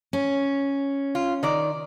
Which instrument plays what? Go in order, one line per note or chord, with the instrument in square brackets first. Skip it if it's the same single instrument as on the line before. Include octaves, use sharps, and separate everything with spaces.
[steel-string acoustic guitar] C#4
[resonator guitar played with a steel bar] F4
D#3 D5